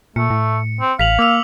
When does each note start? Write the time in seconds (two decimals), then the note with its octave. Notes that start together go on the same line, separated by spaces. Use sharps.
0.16 A#2 A3 C#7
0.30 A2
0.81 C4
0.99 A1 F5 B6 F7 F#7
1.19 A#3 D6 E6 F7